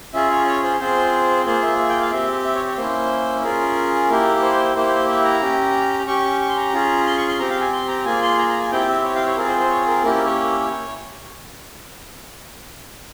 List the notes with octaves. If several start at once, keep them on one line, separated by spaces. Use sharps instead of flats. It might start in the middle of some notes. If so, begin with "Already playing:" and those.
C#4 F4 G#4 E5
C#5
C#5
C5
C4 F4 G#4 C5
A#3 F4 G#4 C5
E5
E5
G5
F5
C4 G4 E5
E5
C#5
C#5
A#3 C#4 E4 C5
C#4 F4 G#4 A#4
A#3 E4 G4
C5
A#3 E4 G4 C5
E5
A#5
C#4 G4
C#4 G4 C#6
C#6
C6
A#5
C#4 F4 G#4
C6
C#6
C6
C4 G4 A#5
F5
G#5
C6
A#5
A#3 F4 G#4 G#5
C6
A#5
A#5
G#5
C4 E4 G4 G5
E5
C#5
F5
C#5
C4 F4 G#4 A#4
C5
C5
C#5
A#4
A#3 C#4 E4 G4 A#4
A#4
C#5